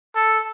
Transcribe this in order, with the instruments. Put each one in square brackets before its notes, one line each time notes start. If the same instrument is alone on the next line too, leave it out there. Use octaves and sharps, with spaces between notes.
[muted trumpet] A4